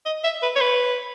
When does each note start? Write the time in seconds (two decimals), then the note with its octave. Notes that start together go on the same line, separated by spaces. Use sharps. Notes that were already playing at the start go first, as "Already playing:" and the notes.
0.06 D#5
0.24 E5
0.42 B4
0.56 C#5
0.61 B4